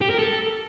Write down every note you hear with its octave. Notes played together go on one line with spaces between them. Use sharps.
G4
A#4
A4